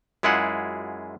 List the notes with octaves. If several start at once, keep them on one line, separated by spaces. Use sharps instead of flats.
F#2 G#3 E4 F4 G#4 F#5